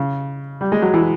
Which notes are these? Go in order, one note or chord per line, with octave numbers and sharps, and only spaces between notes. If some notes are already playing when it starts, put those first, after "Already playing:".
Already playing: C#3
G3
G#3
F#3
E3